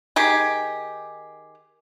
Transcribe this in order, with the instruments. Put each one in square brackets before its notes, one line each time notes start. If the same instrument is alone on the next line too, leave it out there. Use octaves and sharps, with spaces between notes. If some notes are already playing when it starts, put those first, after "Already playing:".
[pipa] D#3 G4 G#4